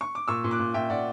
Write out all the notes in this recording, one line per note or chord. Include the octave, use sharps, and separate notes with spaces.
C#6
D6
A#2 C#6 E6
A#2
D6 F#6
A#2
A#2 E5 G5
A#2 D5 F#5